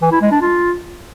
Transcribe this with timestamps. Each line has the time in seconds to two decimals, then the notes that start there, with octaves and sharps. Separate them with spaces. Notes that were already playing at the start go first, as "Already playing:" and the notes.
0.02 E3
0.12 E4
0.22 G#3
0.32 D4
0.41 F4